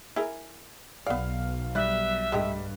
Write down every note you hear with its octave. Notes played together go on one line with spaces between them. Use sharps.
E4 G#4 A#4
B1 B3 D5 F5
G3 E5 F#6
G2 G#3 A3 G4